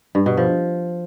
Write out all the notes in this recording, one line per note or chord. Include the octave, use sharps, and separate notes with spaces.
G2
B2
F3